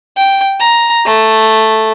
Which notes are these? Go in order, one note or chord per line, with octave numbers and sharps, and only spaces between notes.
G5
A#5
A3